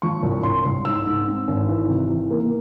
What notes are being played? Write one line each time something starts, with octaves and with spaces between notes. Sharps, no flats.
F3 C#6
C2
C2 C6
C2
G#2 E6
G#2
C4
G#1
E3
C3
E3
A#3